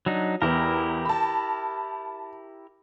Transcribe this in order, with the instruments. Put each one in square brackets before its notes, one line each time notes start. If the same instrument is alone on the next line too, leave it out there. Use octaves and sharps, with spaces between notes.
[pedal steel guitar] F#3 D4 D#4
[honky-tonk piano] E2 B3 [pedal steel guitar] E4 G4 A#4
[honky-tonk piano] A5 B5